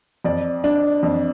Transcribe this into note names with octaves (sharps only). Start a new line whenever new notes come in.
F2 D5
D4
F2